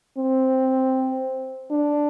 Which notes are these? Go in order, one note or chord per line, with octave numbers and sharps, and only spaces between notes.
C4
D4